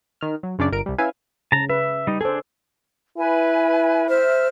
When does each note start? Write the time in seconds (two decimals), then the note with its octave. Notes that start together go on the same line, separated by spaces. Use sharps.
0.21 D#3 F6
0.43 F#3
0.59 F#2 C#3 D4 D5
0.72 G1 A#4 D7
0.86 C2 G3
0.98 C#4 E4 B4 E5 F5 G#5
1.52 C#3 A5 A#5
1.70 B4 E5
2.07 G3 D#4
2.21 D4 G#4 A4 C5
3.18 E4 B4 G#5
4.09 C5 E5 F6